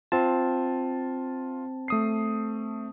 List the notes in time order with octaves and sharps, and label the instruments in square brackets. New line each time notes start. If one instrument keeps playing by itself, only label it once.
[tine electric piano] C4 A5 [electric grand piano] F4
[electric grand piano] A3 D#6 C7